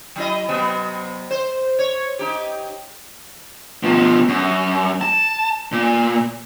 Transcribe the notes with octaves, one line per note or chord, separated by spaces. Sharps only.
F#3 E4 D#5
C3 F#3 B3
C5
C#5
D#4 G4
B2 F3
F#2
A5
A#2